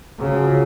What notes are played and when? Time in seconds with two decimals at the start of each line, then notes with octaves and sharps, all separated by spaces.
0.20 C#3 F#3
0.34 F3
0.44 F#3